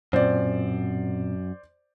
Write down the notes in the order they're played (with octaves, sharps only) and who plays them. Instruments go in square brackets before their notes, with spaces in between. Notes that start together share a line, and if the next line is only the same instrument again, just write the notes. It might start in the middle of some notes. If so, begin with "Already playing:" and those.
[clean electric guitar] F#2 [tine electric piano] A#2 C4 [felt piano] C5 D5